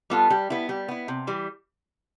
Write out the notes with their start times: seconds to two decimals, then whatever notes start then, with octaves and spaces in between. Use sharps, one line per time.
0.10 G3 B3 F4 A4
0.30 G3
0.50 B3 E4
0.69 G3
0.88 B3 E4
1.08 C3
1.27 E3 G3